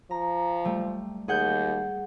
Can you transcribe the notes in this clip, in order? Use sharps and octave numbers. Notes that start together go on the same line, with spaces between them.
F3 A#5
G3 A3
D#2 G#4 F#5 G6